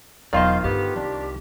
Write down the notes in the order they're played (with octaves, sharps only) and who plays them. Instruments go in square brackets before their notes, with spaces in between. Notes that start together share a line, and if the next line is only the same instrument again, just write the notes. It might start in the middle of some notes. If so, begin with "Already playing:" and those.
[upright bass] E1 F#3 [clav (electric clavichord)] D#3 F4 C5 [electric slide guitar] D5 D#5 [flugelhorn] F5
[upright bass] G2 D3 [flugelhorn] B3 [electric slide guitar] G4
[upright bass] C2 [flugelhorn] D4